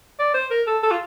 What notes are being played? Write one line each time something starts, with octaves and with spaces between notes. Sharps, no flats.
D5
C5
A#4
A4
A4
F4